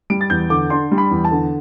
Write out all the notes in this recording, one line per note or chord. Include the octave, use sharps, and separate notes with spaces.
G3 D7
A6
E2 G6
D3 D6
D4 C6
G3
B5
E2
A5
D3